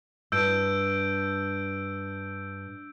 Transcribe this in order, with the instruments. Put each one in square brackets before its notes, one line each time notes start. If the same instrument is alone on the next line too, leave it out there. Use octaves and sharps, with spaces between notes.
[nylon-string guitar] G2 [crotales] E6 G6 D7